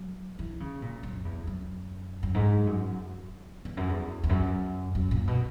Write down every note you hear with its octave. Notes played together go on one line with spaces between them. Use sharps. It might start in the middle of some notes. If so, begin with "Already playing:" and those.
Already playing: F#3
E3
C#3
A#2
F#2
E2
F#2
F#2
G#2
F#2
E2
F#2
E2
E2
F#2
F#2
A#2
B2